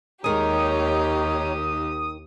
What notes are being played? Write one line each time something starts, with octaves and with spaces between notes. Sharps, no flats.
D#2 D#3 G#3 D#4 G4 C#5 A#5 D#6